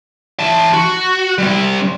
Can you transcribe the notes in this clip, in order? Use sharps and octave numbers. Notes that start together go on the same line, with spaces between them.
E3 A5
F#4
G3 C4